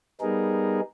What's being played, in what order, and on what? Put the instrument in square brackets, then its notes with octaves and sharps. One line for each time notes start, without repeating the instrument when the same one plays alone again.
[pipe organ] G3 B3 D#4 G#4 A#4